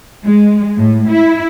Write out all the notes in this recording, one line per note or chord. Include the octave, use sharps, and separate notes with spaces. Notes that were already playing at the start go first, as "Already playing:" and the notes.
G#3
A2
E4